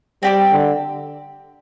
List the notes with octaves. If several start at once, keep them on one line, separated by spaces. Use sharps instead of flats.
G3 C4 G4 D5
D3